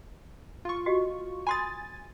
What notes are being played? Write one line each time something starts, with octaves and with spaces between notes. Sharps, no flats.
F4 C#6
F#4 G4 D#5
G#5 B5 C6 D#6 A6